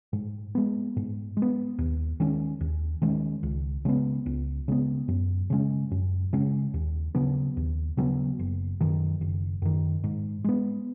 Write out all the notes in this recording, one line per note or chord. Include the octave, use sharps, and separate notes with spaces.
G#2
G#3 B3
G#2
G#3
B3
D#2
D#3 G#3 C#4
D#2
D#3 G#3 C#4
C#2
C#3 G#3 B3
C#2
C#3 G#3 B3
F#2
C#3 G#3 C#4
F#2
C#3 G#3 C#4
D#2
C#3 F#3 B3
D#2
C#3 F#3 B3
F#1
F#2 D#3
F#1
F#2 D#3
G#2
G#3 B3